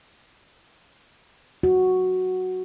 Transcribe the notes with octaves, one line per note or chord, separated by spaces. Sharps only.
F#4